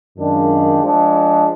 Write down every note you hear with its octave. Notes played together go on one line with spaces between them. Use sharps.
F#2 D#3 G#3 D4 F4
F3 G#3 D4